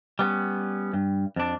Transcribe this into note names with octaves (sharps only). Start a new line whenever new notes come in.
G3 B3 C#4
G2
F2 D4